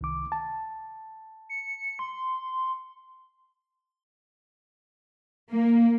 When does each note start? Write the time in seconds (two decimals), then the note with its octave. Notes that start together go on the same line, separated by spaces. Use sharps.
0.01 C2 D#3 D6
0.32 A5
1.49 C#7
1.99 C6
5.50 A#3